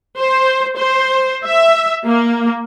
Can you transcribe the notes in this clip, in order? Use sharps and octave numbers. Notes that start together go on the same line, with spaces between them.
C5
C5
E5
A#3